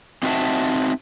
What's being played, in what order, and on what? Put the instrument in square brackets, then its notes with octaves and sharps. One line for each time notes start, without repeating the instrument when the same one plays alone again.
[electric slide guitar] C4 D#4 F#4 A#4 E5 A5